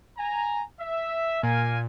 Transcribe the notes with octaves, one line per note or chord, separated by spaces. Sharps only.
G#5 A#5
E5
A#2 A#4 F5 G#5